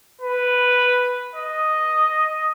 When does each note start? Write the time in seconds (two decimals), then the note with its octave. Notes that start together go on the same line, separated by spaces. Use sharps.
0.21 B4
1.36 D#5